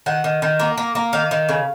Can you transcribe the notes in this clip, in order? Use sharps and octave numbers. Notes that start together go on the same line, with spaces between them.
D#3 F#5
D#3
D#3
A#3
A#3
A#3
D#3 F5
D#3
C#3